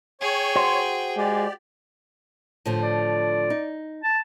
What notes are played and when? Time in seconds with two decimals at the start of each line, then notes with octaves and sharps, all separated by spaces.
0.21 G#4 C#5 G5
0.56 F#4 C5
1.17 G#3 G4 D5
2.66 A2 D3 F3
2.83 D5
3.50 D#4
4.03 A5